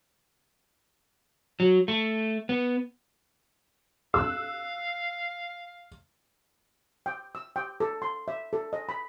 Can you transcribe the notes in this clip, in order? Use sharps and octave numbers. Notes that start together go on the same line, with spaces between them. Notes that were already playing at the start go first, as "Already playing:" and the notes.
F#3
A3
B3
F5 E6 F#6
G5
E6
G5
A4
C6
E5
A4
D#5
B5